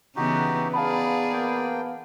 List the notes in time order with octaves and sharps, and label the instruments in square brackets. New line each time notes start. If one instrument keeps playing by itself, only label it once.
[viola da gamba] C#3 E3 B3 [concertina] D#4 F#4 G4
[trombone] B3 [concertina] D#4 [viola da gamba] G#4 D5 [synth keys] F5 A5 B5
[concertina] A#3 G5